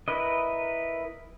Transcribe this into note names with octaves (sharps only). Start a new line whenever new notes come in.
E4 A#4 B4 D#5